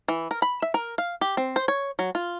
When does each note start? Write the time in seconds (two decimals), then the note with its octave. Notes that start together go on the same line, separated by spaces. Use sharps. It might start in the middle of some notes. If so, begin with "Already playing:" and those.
0.08 E3
0.31 A#4
0.42 B5
0.62 E5
0.74 A#4
0.98 F5
1.21 G4
1.37 C4
1.56 C5
1.68 C#5
1.99 F#3
2.15 F4